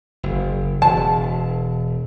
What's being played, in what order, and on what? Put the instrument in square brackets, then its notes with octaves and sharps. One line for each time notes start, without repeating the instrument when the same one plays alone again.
[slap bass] F#1
[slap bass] E1 [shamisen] A5